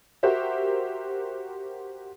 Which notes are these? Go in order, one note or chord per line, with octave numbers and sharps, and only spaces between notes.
F#4 G4 A#4 C5 E5